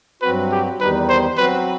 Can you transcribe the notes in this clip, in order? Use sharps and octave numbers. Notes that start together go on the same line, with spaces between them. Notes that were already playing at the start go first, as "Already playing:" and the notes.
G2 F#3 C4 F#4 B4
G4
E2 D#3 G3 D#4 B4
C5
F#3 C4 F#4 B4